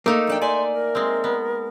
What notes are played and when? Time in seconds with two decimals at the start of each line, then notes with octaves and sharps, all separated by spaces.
0.06 A3 A#3 D#4 A4
0.27 F2 D4 G5
0.41 D5 E5 G#5 C6
0.73 A#4
0.95 G#3 C4
1.24 B3